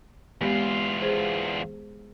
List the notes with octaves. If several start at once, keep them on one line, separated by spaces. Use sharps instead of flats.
E2 G#3 B3 F4 G4
G#4 C5